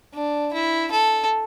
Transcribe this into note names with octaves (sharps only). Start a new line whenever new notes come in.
D4
E4
A4